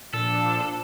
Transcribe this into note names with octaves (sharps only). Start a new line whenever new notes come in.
A#2 F3 D4 A4